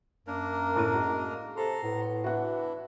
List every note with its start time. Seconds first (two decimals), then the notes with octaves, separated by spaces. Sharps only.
0.27 F#2 A#3 D4 A#4
0.76 A2 A#5 D#7
0.94 G#3 F#4
1.57 C3 A4 A#5 C6
1.83 A2 B3
2.24 E3 D4 E4 F#4 F#5